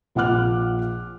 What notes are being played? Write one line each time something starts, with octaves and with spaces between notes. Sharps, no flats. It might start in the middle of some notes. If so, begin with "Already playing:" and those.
A#1 F3 F#5 D6 F6 F#6